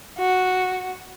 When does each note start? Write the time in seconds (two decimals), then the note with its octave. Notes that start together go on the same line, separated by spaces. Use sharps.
0.18 F#4